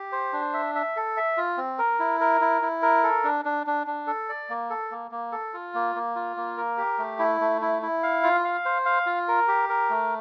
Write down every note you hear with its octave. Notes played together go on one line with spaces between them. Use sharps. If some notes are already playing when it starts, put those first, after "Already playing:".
Already playing: G4
C5
D4
E5
E5
A4
E5
F4
C4
A#4
E4
A#4
E4
E4
A#4
A4
D4
D4
D4
D4
A4
D5
A#3
A4
A#3
A#3
A4
F4
A#3
A#3
F4
A#3
A#4
G4
A3
E4
A3
E4
E4
F5
F4
F5
C5
F5
F4
A#4
G4
A#4
A3